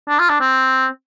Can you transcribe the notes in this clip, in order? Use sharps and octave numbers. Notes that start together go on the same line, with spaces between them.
D4
F4
D4
C4